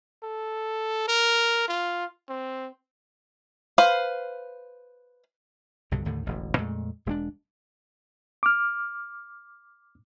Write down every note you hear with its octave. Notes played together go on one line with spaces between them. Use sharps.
A4
A#4
F4
C4
B4 C5 F5
C2 G2 B2 D3
D#2 A2 D3 D#3
E1 A1 D2
F2 A#2 G#3 A3
E1 G#3 B3 D4
D6 F6